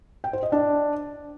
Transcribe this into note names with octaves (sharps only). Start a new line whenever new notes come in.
G5
C5
D#5
D4